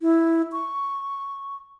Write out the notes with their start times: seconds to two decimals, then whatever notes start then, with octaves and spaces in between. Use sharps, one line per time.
0.01 E4
0.52 C#6